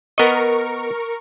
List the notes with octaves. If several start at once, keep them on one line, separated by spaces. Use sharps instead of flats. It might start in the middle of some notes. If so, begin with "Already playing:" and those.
B3 A#4 D#5 C#6